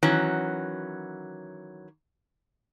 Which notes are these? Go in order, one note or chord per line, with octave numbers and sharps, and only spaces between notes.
D#3 E3 F#3 C#4